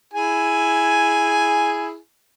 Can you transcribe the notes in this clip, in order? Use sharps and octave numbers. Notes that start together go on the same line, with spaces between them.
E4 G#4 G#5